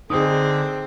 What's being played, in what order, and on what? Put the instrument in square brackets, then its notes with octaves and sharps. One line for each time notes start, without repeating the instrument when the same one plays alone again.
[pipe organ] D3 [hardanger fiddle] C4 [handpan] D#4 G#4 [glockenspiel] D#6